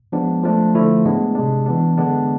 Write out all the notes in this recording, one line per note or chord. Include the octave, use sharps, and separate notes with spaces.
F3 G#3 B3 D4
F3 A3 D4
D3 F3 A3 E4
A2 G#3 B3 D4
C3 G#3 D4
E3 B3 D4
D3 G#3 B3 D4